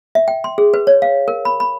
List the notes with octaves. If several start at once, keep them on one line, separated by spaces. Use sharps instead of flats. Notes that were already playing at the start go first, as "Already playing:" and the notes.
E5
G5
C6
G#4
B4
C#5
F5
A#4
B5
B5